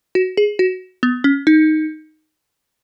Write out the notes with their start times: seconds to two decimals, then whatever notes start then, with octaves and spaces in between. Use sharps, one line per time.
0.15 F#4
0.37 G#4
0.59 F#4
1.03 B3
1.24 C#4
1.47 D#4